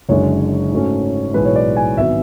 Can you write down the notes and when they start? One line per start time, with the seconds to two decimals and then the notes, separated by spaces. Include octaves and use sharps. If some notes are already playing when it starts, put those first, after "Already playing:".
0.09 F#1 F#2 D3 G#3 C#5
0.71 G#2 F#3 A3 C#4
1.34 B1 A2 E3 G#3 B4
1.45 C#5
1.56 D5
1.76 G#5
1.97 G#1 F#3 B3 E5